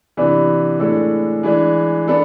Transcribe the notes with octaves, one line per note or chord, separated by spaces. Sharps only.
C3 E3 B3 D4
A2 G#3 D4 A4
E3 G#3 D4
B3 D4 A4